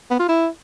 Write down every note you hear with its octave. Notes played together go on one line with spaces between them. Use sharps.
B3
F4
E4